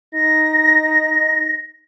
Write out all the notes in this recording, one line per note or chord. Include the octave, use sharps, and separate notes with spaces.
D#4 A#6